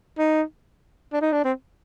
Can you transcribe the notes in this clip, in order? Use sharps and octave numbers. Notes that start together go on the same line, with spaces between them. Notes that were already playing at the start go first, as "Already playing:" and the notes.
D#4
D4
D#4
D4
C4